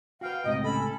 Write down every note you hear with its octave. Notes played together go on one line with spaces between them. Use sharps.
F#4 B4 F5 G5
C#2 A2 C3 D#5
C#4 A4 B5